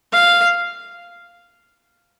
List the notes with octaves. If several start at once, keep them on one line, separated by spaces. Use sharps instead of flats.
F5